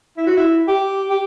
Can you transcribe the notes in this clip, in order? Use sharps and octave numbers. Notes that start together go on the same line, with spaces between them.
E4
F#4
E4
G4
G4